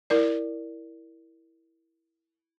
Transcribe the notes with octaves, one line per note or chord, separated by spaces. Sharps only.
E4 A#4 D5